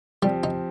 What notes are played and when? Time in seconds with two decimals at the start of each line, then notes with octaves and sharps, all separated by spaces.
0.22 F3 G3 C4 G4
0.43 D#4